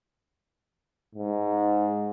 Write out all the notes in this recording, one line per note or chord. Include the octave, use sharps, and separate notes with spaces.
G#2